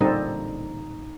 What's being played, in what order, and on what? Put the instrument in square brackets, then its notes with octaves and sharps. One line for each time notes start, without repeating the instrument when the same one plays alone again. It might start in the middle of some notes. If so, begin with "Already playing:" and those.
[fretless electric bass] A1 A#2 D3 [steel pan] G3 C4 A4 [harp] D#4